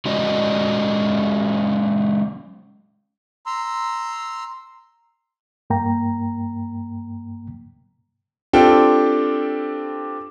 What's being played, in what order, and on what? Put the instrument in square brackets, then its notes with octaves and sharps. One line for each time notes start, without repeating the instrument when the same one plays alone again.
[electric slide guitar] F#3 G#3 C#4 F#4 D5 D#5
[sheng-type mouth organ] A#5 C6 E6
[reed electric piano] G2 A#3 G5 A#5
[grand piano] C4 D4 F4 G4 A4 G5